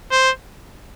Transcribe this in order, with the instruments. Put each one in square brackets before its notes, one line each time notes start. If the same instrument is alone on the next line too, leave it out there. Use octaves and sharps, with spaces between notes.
[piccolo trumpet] C5